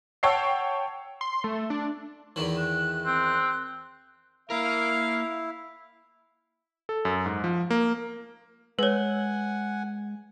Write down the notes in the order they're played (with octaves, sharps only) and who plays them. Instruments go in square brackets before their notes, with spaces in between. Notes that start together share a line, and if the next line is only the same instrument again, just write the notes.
[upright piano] C#5 F#5 G5 A5 E6 C7
[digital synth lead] C6
A3
D4
[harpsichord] E2 D#3 E3
[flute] F#6
[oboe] C4
[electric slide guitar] A#3 A#4 [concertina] E4 [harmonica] F5
[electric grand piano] A4
F#2
G#2
F3
A#3
[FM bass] G#3 [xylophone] B4 C#5 [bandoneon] F#5 G#5